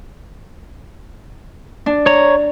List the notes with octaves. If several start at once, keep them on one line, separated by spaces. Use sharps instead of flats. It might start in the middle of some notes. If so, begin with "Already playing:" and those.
D4
C#5 A#5